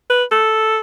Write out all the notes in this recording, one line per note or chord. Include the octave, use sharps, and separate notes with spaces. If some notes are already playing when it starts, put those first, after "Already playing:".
B4
A4